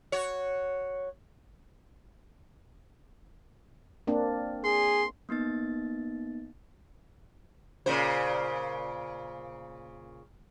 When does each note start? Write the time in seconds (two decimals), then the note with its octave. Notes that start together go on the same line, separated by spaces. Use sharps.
0.12 F#4 C#5
4.07 A#3 C4 D4
4.64 G#4 C6
5.29 A#3 B3 D#4 A6
7.86 A#2 C#3 C5